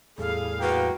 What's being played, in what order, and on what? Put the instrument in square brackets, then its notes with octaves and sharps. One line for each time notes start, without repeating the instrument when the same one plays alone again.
[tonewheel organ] E2 A2 G3 [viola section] G#4 F5 [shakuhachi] A4
[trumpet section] A#3 F#4 G5 [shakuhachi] B4